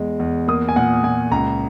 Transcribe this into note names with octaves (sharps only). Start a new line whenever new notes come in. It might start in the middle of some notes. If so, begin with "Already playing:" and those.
Already playing: E2 G#3
E2
A#3 D#6
G#5
A#2 F#5
A#2 G#5
C#2 A#5